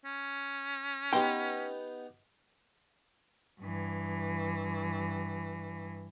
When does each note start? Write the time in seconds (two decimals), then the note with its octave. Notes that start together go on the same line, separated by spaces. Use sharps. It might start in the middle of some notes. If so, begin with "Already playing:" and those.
0.05 C#4
1.13 B3 D#4 G4 G5 C6
3.61 G2 E3